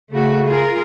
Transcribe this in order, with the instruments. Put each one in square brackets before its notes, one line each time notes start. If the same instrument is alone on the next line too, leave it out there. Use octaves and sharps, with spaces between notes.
[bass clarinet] C#3 [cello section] A3 F#4
[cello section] F4 G#4 A#4